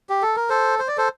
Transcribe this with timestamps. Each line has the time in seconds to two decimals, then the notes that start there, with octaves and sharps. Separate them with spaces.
0.09 G4
0.22 A4
0.36 A#4
0.50 A4 C5
0.79 C5
0.88 D5
0.97 A4 C5